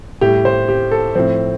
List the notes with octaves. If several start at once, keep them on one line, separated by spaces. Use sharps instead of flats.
A2 G3 G4
C5
G4
A4
A2 F3 C4